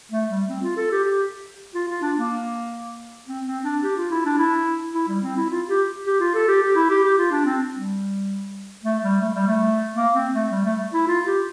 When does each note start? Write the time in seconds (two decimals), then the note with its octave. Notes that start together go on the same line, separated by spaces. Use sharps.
0.12 A3
0.30 G3
0.49 C4
0.63 F4
0.77 A4
0.92 G4
1.05 G4
1.75 F4
1.88 F4
2.02 D4
2.17 A#3
3.28 C4
3.46 C4
3.64 D4
3.84 G4
3.97 F4
4.11 E4
4.25 D4
4.39 E4
4.95 E4
5.09 G3
5.23 C4
5.37 E4
5.50 F4
5.69 G4
6.06 G4
6.20 F4
6.35 A4
6.48 G4
6.62 G4
6.76 E4
6.90 G4
7.04 G4
7.18 F4
7.31 D4
7.45 C4
7.74 G3
8.84 A3
9.03 G3
9.21 A3
9.34 G3
9.47 A3
9.96 A#3
10.14 C4
10.34 A3
10.52 G3
10.65 A3
10.94 E4
11.08 F4
11.26 G4